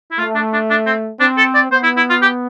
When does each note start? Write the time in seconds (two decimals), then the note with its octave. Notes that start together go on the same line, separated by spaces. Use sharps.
0.11 E4
0.19 A3 F4
0.35 D4
0.53 D4
0.70 D4
0.86 C4
1.20 C4 D4
1.37 A4
1.55 D5
1.71 B3 C5
1.83 E4
1.97 E4
2.10 F4
2.22 G4